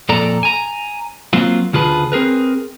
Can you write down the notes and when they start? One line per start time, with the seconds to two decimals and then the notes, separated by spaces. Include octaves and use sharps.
0.09 F2 A#2 A4 D5 A#5
0.43 G#5 A#5
1.33 F#3 A#3 C4 F4
1.73 D2 C#3 F4 G#4 B4 A5
2.12 C4 G#4 A#4 B4